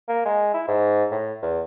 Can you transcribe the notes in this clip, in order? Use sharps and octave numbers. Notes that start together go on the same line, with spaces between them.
A#3
G#3
E4
G#2
A2
E2